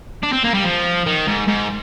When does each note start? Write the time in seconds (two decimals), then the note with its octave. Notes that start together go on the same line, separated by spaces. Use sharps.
0.23 D4
0.32 C4
0.44 A#3
0.54 G3
0.64 F3
1.06 D#3
1.28 G#2
1.48 G#2